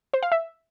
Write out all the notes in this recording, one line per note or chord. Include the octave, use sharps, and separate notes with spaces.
C5
F5
E5